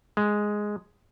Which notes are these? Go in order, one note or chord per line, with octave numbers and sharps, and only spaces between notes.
G#3